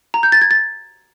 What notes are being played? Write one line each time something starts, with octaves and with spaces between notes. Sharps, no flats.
A#5
G6
A6
G#6
A6